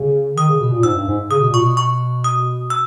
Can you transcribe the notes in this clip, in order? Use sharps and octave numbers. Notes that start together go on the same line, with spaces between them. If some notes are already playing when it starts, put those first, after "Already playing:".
Already playing: C#3
D#3 D#6
C#3
B2
A#2
G#2 E6
G2
G#2
C#3 D#6
B2
A#2 C#6
B2
C#6
D#6
E6